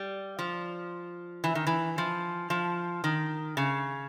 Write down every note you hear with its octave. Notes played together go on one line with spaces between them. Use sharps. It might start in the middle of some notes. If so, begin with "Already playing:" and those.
Already playing: G3
F3
E3
D#3
E3
F3
F3
D#3
C#3